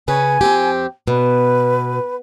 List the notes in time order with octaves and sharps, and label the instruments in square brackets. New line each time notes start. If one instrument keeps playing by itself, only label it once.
[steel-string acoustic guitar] C#3 C#4 B4 [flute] G#5
[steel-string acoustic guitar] F2 C4 G4
[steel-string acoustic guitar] B2 [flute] B4